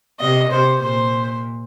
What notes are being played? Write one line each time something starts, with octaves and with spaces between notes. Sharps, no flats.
C3 D#5
C3 C5
A#2 C5